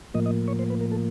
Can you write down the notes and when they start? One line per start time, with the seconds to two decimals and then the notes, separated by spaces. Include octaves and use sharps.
0.14 A2 F3 A#3 D#5
0.26 D#5
0.48 C#5
0.59 C5
0.70 B4
0.81 A#4
0.92 A4